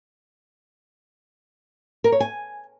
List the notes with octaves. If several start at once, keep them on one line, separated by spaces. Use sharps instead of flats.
A#4
C#5
G#5